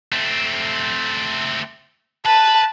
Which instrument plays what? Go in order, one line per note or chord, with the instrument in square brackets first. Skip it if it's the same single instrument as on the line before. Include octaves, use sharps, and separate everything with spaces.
[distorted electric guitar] A3 C4
[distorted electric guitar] B4 [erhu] A5